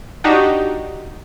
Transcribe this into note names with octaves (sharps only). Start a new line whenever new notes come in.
D4 D#4 F#4 G4